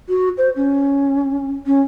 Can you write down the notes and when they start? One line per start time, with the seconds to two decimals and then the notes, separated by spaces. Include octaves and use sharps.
0.09 F#4
0.38 C5
0.56 C#4
1.66 C#4